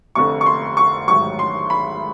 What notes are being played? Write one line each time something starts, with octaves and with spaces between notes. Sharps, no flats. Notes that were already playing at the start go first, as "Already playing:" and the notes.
F1 F2 D3 C#6
C#6
C6
C#6
A1 G#2 D#3 F#3 C#6
C6
B5